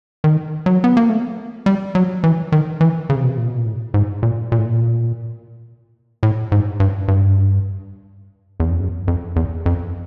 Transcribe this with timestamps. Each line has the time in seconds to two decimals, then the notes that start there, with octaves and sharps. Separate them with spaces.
0.24 D#3
0.66 F#3
0.84 B3
0.97 A#3
1.09 A3
1.66 G3
1.95 F#3
2.24 E3
2.52 D#3
2.81 E3
3.10 C#3
3.16 C3
3.23 B2
3.30 C3
3.37 A#2
3.48 B2
3.58 A#2
3.66 A2
3.94 G#2
4.23 A#2
4.52 A#2
4.58 A2
4.66 A#2
6.23 A2
6.52 G#2
6.80 G2
7.08 G2
8.60 E2
8.70 F2
8.80 F#2
9.08 F2
9.36 E2
9.66 F2